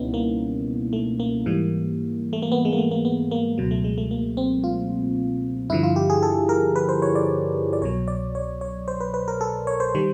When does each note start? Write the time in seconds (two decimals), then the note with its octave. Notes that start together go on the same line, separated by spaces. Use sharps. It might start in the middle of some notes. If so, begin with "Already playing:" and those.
Already playing: C#2 B2 G3 B3 C#4 D#4 E4
0.14 A#3
0.93 A3
1.20 A#3
1.46 G#2 E3 G3
2.33 A3
2.42 A#3
2.52 B3
2.65 G#3
2.73 A#3
2.78 A3
2.91 A#3
3.05 B3
3.31 A#3
3.58 C#2 B2 F#3
3.71 A3
3.84 G#3
3.98 A3
4.11 A#3
4.37 C4
4.64 F4
5.70 G2 D3 F3 E4
5.83 F4
5.96 G4
6.10 G#4
6.23 A4
6.49 A#4
6.76 B4
6.89 C5
7.02 C#5
7.15 D5
7.73 D5
7.81 C2 B2 F#3 C#5
8.08 D5
8.35 C#5
8.61 C#5
8.88 C5
9.00 B4
9.14 B4
9.28 A#4
9.41 A4
9.67 C#5
9.80 C5
9.95 D#3 G3